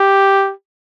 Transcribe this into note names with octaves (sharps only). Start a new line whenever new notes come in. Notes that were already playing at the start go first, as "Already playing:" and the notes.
Already playing: G4